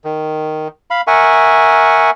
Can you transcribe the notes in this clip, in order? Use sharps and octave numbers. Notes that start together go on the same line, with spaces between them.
D#3
F5 B5
A#4 E5 F#5 G#5 C#6